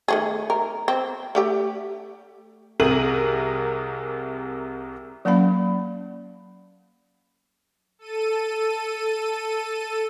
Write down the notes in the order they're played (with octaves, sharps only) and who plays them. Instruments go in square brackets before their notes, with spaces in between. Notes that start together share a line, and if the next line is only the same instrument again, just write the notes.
[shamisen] D#3 A3 G#4
A#4
C4
A3 G4 G5
[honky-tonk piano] C2 C3 G#4 A#4 D#7 F#7
[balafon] F#3 A#3 C#4 F5 F#5 B5
[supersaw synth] A4 D#7